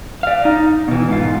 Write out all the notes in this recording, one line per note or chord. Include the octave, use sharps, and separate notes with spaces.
D5 F5
D#4
B2 E3
G#2 F4